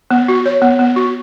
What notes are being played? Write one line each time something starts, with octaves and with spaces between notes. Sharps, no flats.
B3
F#4
C#5
B3
B3
F#4